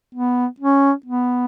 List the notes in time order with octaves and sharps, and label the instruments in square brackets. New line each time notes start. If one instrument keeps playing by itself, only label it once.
[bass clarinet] B3
C#4
B3